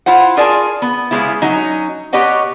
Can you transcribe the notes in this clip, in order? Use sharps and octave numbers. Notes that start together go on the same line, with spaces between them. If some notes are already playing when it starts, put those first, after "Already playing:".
E4 F4 C5 F#5
F4 G#4 A#4 D5 G#5 A5
B3
C#3 F#3 G#3 B3 E4
F#3 C#4 D#4
B2 G4 B4 C#5 D#5 F#5